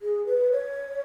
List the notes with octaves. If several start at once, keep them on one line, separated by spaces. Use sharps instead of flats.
G#4
B4
C#5